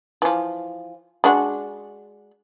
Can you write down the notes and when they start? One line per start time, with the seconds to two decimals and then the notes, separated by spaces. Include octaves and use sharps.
0.22 E3 F3
1.24 G#3 D4 F#4